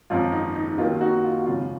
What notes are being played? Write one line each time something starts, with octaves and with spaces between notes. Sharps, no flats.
G#1 F#2 F3 F4
D#4
D#4
D#4
D#2 D#3 F#3 A#3 F4
D#4 F#4
F4
F#4
G#1 F#2 C#3 F3 F4